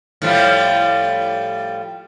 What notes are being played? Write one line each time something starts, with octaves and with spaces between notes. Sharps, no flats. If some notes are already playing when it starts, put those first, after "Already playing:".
A2 F3 G3